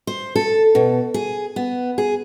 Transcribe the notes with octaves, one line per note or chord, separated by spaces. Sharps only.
C5
A4
B2
G#4
B3
G#4